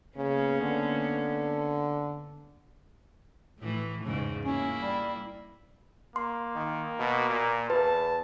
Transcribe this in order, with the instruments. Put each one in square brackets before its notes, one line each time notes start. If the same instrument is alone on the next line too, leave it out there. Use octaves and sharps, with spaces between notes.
[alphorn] C#3 [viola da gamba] A#3 B3 C#4
[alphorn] D3
[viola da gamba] A2 E3
E2 G#2 C#3
[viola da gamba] A#3 E4 [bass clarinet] C#4
[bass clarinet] G3
[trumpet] A#3 [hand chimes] C6
[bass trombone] D#3
B2
A#2
[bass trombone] E2 [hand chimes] B4 [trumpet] A5